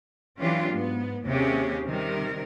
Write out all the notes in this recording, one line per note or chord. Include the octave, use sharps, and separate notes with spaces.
E3 F#3 C#4 D4 F4 G4
G#2 B3
D#2 C3 A#3 C#4 G4 G#4
C3 D#3 G3 A#4